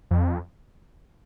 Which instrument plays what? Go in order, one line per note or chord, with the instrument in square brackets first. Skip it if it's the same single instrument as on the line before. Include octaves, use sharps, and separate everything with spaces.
[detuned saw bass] F2